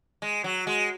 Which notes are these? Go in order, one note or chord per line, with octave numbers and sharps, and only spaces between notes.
G#3
F#3
G#3